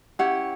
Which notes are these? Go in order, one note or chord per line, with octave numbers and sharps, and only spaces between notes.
C#4 E4 G4 F#5